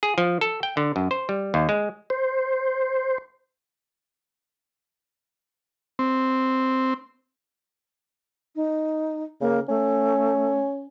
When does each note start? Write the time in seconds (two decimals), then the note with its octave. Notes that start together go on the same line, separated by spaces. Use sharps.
0.03 G#4
0.18 F3
0.41 A4
0.63 G5
0.77 D3
0.96 F#2
1.11 C5
1.29 G3
1.54 D#2
1.69 G#3
2.10 C5
5.99 C4
8.56 D#4
9.41 C#3 A#3
9.69 A3 C#4